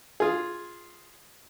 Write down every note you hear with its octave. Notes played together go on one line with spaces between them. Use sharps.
F4 G#4